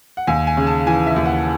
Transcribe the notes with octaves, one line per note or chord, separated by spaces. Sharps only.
F#5
D#2 G#5
G#5
C#3
A5
E3 G#5
E5
D#2
F#5